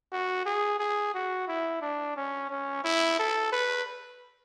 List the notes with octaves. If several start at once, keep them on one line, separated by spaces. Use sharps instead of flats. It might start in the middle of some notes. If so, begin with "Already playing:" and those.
F#4
G#4
G#4
F#4
E4
D4
C#4
C#4
E4
A4
B4